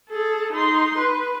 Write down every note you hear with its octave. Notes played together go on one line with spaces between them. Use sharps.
G#4 A4
D#4 C6
B4